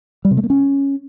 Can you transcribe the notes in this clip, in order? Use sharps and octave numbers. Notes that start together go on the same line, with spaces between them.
G3
C3
A3
A#3
C#4